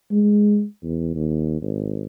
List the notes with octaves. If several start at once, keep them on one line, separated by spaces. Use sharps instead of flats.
G#3
E2
D#2
G#1